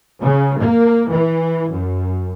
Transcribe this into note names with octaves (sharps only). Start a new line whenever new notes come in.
C#3
A#3
E3
F#2